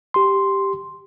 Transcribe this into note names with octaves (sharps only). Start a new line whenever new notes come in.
G4 C6